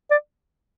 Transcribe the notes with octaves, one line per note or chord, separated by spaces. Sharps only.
D5